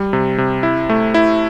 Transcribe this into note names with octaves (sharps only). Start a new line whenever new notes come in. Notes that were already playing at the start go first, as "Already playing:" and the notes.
Already playing: G3
C3
C3
E4
A3
E4